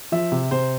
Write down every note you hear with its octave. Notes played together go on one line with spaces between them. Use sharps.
F3 E5
C3
C3 C5